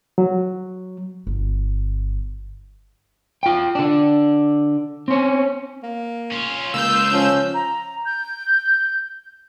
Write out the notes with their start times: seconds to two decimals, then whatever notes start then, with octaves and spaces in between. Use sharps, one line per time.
0.18 F#3
1.27 G1
3.43 F4 G5
3.75 D3 D4
5.08 C4 C#4
5.83 A#3
6.32 C#4 F4
6.74 C#2 A#3 F4 E6 G6
7.13 F3 C#4
7.54 A#5
8.05 G6